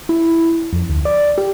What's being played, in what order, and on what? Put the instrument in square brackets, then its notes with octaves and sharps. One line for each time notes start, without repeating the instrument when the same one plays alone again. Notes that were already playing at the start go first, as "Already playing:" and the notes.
[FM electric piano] E4
F2
D2
D5
G4